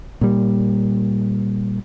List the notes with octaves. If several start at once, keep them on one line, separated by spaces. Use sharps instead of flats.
A#2 G3